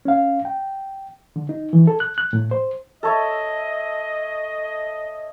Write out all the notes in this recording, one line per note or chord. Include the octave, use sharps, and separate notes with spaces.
C#4 F5
G5
D3
D#4
E3
A4
F#6
F#6
A2
C5
A4 C#5 D#5 E5